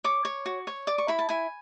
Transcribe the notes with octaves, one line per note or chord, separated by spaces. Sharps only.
C#5 D6
C#5
F#4
C#5
D5 D6
C#6
E4 B5
A5
E4 G#5